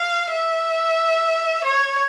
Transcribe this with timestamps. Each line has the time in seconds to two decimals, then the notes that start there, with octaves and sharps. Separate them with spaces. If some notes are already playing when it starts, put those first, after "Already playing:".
Already playing: F5
0.33 E5
1.64 C#5